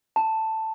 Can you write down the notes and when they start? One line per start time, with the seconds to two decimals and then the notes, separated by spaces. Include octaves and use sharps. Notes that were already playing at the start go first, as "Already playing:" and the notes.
0.16 A5